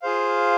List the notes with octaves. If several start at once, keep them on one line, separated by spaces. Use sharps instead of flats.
F4 G#4 C5 F5